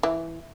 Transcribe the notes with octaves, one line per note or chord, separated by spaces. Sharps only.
E3